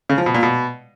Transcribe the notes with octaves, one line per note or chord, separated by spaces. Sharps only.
C#3
F3
B2
A#2
B2